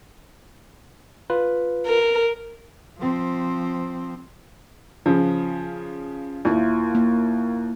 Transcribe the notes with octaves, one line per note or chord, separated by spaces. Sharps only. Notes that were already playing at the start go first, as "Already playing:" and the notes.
F4 B4
A#4
F3 C4
C#3 F3
D#2 A#3 E4 F4
A#3